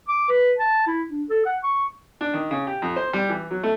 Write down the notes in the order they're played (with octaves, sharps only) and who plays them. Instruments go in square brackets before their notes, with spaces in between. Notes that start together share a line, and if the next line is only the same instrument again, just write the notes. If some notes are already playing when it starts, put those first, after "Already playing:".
[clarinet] D6
B4
A5
E4
D4
A4
F#5
C#6
[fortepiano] D4
D#3
C#3
G4
F2
C5
G3
E3
F#3
A3